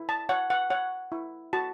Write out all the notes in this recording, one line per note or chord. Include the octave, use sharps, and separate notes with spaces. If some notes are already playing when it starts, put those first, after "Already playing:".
Already playing: E4
A5
C#5 F#5
F#5
C#5 F#5
E4
F#4 A5